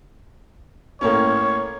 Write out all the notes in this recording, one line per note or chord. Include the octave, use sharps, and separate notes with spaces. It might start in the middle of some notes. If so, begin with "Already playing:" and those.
A2 A#3 C#4 C#5